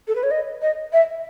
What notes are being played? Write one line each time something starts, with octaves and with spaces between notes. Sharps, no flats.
A4
B4
C#5
D#5
D#5
E5